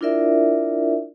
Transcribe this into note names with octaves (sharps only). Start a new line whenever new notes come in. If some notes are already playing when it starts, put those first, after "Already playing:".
D4 E4 F4 A#4 D5 E5